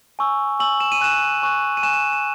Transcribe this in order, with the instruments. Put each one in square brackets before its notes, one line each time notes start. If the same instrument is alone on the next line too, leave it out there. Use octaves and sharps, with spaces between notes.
[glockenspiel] G#5 C#6 E6
G#5 C#6 E6 F#7
E7
D#7
G#5 C#6 F#6 E7
G#5 C#6 F#6
D#7
G#5 C#6 F#6 E7
E7
E7